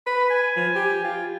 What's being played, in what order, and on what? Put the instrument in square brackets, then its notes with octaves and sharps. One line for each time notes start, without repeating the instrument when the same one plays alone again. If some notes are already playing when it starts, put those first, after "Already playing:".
[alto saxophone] B4 [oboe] B5
[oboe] G#5
[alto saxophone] F3
G4
F4